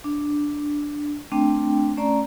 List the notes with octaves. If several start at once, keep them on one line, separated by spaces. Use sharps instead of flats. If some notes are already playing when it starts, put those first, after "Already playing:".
D4
A3 C4 D4 G5
A3 C#4 D5 A#5